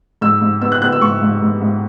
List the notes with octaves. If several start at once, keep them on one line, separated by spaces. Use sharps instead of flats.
G#2 E6
G#2
B3 E6
F#6
B3 F#6
E6
G#2 C#6
G#2
G#2
G#2